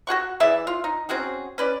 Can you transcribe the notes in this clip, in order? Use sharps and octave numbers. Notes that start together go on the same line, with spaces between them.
F#4 G#4 F#5 C#6
E3 G#4 D5 E5
F4
D#4
C4 C#4 F#4 G#4
C#4 B4 D5